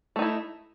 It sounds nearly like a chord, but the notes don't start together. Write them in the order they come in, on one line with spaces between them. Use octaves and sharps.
A3 D#4 E4